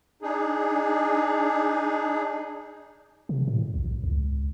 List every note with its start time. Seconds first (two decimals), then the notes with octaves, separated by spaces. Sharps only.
0.22 D4 D#4 G#4
3.29 C3
3.48 A2
3.74 B1
4.04 C#2